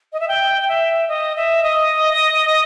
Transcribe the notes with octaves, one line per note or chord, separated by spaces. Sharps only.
D#5
E5
G5
E5
D#5
E5
D#5